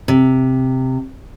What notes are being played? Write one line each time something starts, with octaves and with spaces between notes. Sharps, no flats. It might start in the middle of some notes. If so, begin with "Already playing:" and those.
C3